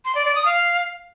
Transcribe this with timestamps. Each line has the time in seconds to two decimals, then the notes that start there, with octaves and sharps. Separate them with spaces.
0.05 C6
0.15 D5
0.25 D5
0.36 D#6
0.46 F5